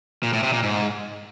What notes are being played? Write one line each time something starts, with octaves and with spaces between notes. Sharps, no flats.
A#2
A2
C3
A#2
G#2